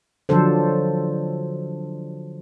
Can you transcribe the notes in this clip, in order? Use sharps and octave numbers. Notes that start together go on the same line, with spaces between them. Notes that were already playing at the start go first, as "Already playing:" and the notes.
D3 F3 F#3 D4 A4 C5